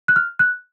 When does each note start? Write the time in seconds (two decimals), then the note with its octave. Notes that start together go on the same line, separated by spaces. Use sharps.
0.08 F#6
0.16 F6
0.39 F#6